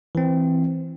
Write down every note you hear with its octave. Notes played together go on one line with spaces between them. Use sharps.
E3 C4